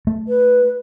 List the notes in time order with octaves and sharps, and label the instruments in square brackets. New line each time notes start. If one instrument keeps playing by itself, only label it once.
[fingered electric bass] A3
[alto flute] B4